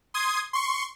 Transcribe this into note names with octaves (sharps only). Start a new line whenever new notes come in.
C6 D#6 G#6
C6 C#6